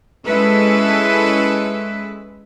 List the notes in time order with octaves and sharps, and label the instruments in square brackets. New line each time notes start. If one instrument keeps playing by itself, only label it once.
[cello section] G#3 C#4 E4 A4 B4